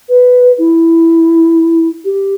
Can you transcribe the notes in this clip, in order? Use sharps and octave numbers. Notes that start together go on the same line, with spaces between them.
B4
E4
G4